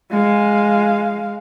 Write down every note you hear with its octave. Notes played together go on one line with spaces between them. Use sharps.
G#3 F5